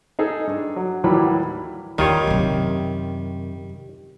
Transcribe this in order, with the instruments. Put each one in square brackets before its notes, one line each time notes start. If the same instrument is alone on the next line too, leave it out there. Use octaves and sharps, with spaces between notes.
[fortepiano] D#4 G#4 A4
G2
F#3
D#2 A2 E3 F#3 G3 B5
[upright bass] D#2 [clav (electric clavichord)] D#3 F4 C#5 [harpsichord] G3
[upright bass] F#2 C3